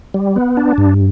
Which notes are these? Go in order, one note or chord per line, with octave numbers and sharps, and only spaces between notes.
G3
B3
D4
G2